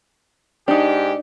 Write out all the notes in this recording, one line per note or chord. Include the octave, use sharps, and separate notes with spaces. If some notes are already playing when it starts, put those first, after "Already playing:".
G#2 D4 D#4 G4